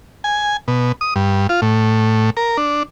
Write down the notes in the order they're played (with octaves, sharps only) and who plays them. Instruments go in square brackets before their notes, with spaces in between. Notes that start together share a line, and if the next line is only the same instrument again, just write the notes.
[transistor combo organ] G#5
B2
D#6
G2
F4
A2
A#4
D4